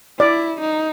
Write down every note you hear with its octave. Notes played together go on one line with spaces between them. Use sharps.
E4 D5
D#4